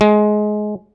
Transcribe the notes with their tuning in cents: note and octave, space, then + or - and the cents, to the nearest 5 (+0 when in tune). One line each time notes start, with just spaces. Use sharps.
G#3 +20